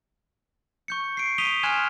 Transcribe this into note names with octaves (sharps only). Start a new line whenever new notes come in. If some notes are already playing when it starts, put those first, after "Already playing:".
C#6 G6 C#7
C7 D7
C#6 D#6 B6 D#7 F7 G7
G#5 C6 F6 F#6 G#6 E7